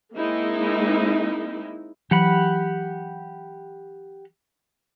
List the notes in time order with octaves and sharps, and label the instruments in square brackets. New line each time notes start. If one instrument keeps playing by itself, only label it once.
[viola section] G#3 A#3 C4 D#4 E4
[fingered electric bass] E3 F#3 [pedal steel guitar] G4 F#5 B5